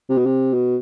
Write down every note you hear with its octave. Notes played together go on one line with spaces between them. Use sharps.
C3
B2
C3
B2